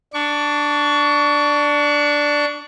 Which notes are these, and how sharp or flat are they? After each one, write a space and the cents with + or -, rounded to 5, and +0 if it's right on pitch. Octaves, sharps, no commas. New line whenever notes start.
D4 +0 C#6 +30